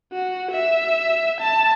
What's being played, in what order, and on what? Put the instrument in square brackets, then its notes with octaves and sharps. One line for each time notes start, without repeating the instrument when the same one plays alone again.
[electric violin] F#4
E5
A5